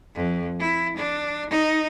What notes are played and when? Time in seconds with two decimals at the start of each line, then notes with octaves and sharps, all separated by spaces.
0.15 F2
0.60 E4
0.97 D4
1.50 D#4